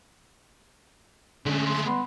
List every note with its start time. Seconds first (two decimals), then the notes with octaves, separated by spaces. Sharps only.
1.46 D3 G#3 A3 C#4
1.67 C6
1.83 B3